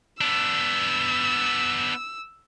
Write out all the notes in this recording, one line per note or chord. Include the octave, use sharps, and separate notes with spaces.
B3 D4 E6